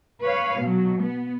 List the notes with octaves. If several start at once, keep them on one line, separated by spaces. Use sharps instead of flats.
B4 C#5 F5
B2 F#3
B3